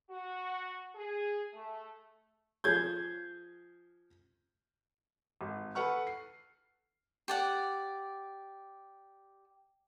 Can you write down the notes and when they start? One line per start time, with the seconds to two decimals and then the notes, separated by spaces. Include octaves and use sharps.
0.10 F#4
0.96 G#4
1.54 A3
2.64 F3 G#4 C#5 G6 G#6
5.41 G#1
5.75 A4 B4 F#5 C#6 F6
6.07 C7
7.28 G4 D5 F#5